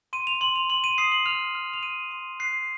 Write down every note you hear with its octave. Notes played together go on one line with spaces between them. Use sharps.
C6 D#7
F7
C6 F#7
F7
C6 F#7
D#7
D#6 C7
F#7
F6 F7
F6
F7
F6 D#7
C6
F#6 C7